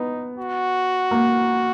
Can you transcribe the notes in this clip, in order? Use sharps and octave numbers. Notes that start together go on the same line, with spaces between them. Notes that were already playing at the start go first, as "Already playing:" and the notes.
Already playing: B3 D#4
F#4
A#3